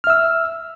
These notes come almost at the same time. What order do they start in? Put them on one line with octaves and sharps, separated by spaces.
F6 E5 E6